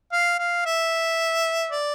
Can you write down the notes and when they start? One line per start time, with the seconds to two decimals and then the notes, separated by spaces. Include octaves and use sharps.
0.12 F5
0.39 F5
0.66 E5
1.72 D5